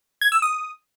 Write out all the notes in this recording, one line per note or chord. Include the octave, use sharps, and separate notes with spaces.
G#6
E6
D#6